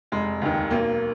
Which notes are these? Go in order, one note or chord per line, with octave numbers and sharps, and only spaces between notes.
F1 G#3
D#2 D#3
B1 A#3